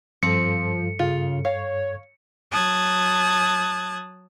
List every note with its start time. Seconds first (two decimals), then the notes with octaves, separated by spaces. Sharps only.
0.23 G2 F3 C4 A4 C#7
0.99 C#3 F4
1.45 C#5 F5
2.52 F#3 A5 D#6 F#6 G#6